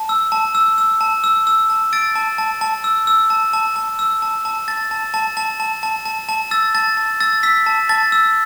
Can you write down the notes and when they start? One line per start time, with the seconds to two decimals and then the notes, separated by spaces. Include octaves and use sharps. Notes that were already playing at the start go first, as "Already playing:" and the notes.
Already playing: A5
0.09 E6
0.32 A5
0.55 E6
0.78 E6
1.01 A5
1.24 E6
1.47 E6
1.70 A5
1.93 E6 A6 D7
2.15 A5
2.38 A5
2.61 A5
2.84 E6
3.07 E6
3.30 A5
3.53 A5
3.76 A5
3.99 E6
4.22 A5
4.45 A5
4.68 A5 A6
4.91 A5
5.14 A5
5.37 A5
5.60 A5
5.83 A5
6.05 A5
6.29 A5
6.51 E6 A6
6.75 A5 A6
6.97 A5
7.20 E6 A6
7.43 E6 B6
7.66 A5
7.89 A5 A6
8.12 E6